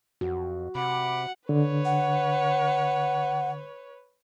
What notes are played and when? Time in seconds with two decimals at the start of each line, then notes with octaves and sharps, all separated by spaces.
0.21 F2 F#4
0.75 C3 F#5 B5 D6
1.49 D3 B4 C#5
1.85 F#5